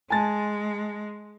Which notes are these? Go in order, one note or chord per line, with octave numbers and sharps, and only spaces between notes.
G#3 G#5 A5 A6